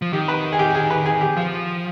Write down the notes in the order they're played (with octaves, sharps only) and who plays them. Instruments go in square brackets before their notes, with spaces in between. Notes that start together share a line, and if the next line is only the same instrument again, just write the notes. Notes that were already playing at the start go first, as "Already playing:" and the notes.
[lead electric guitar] F3
[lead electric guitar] D#3 [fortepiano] G4
[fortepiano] B4
G#4
G4
G#4
B4
G#4
G4
[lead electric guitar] F3 [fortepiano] F4